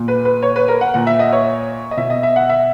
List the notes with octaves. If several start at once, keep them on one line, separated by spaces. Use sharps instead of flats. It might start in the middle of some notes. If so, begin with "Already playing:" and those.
Already playing: A#2
B4
B4
C#5
B4
A#4
F#5
A#2 F#5
E5
D#5
C#5
D#5
B2 E5
D#5
E5
F#5
E5